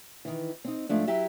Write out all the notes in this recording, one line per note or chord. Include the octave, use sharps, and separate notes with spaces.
D#3 E3
C4 D#4
G#2 F3 A3 D4
F#3 E4 G4 E5